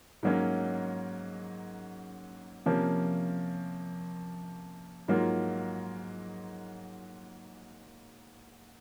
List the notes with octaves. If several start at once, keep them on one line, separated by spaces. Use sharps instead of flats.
G#2 F#3 A#3 C#4
C3 F3 A#3 C#4
G#2 F#3 A#3 F4